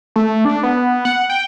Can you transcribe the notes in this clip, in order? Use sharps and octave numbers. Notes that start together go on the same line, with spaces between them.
A3
D4
B3
F#5
G5